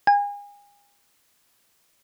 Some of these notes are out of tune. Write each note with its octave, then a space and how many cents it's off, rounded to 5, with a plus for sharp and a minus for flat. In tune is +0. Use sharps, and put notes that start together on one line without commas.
G#5 -35